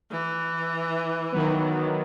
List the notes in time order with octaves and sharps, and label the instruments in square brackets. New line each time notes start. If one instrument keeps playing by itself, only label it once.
[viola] E3
[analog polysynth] D#3 F#3 B3